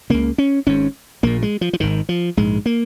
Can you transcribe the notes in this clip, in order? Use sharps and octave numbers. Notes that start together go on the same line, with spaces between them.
C#2 C#3 A#3
C#4
G#1 G#2 C#4
A#1 A#2 A#3
G#3
F3
F3
G#1 G#2 D#3
F3
A#1 G#2 G#3
A#3